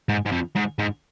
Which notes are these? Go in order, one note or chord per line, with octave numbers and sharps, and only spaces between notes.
G#2
G#2
F2
G#2
G#2